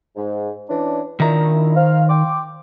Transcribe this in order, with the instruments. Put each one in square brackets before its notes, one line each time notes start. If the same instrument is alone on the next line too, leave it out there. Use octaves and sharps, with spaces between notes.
[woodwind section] G#2
E3 C#4 D4
[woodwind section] A#2 D4 E4 [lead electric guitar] D#3 A#5
[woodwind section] C5 F5
G5 C6 D6